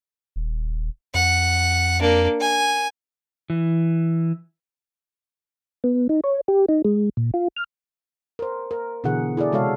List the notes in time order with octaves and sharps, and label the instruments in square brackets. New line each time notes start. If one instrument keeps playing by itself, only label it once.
[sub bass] D#1
[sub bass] F2 [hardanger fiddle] F#5
[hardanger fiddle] A#3 D4
G#5
[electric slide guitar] E3
[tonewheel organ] B3
D#4
C#5
G4
D#4
G#3
A#2
F4
F6
[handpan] A#4 C5
A#4
B2 D3 E3 G#4 F#5
E4 G#4 A4 D5
C3 G#3 F#4 A4 C#5 F5